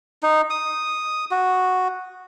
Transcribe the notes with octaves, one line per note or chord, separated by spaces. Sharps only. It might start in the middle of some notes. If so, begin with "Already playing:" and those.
D#4
D#6
F#4